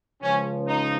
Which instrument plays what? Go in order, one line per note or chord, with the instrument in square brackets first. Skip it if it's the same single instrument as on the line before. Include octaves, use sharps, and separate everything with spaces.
[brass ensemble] C#2 C#3 F3 [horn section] C#4
[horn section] D#4